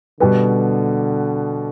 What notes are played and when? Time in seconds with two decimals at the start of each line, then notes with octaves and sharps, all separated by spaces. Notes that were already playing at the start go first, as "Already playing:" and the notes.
0.20 B2 D3 G3 B3